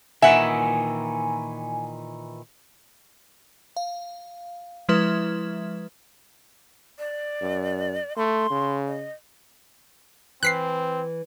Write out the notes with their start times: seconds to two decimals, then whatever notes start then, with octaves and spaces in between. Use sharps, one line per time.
0.22 A#2 D#3 E3 E5 F#5 G#5
3.77 F5
4.89 F3 G#3 E4 B4 E5
6.99 D5
7.41 F#2
8.17 A3 C6
8.50 C#3
8.87 D#5
10.43 E3 C4 F#6 B6 C7